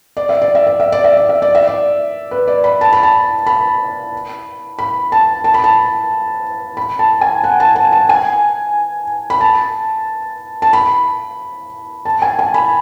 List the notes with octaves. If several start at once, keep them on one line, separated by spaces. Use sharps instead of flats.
D5
E5
D5
E5
D5
E5
D5
E5
D5
E5
D5
E5
D5
B4
D5
B5
A5
B5
A5
B5
B5
A5
A5
B5
A5
B5
A5
G#5
F#5
A5
A5
A5
G#5
B5
A5
A5
B5
A5
G#5
G#5
B5